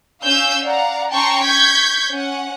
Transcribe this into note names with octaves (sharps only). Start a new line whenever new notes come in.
C#4 F5 E6 G6
D5 F5 F#5 A#5
C#4 G5 A5 A#5 C6 C#6
C#6 G6 G#6 B6
C#4 F#5